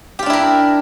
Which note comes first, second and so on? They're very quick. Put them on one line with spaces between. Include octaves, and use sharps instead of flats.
G4 F4 D4 E4 A#4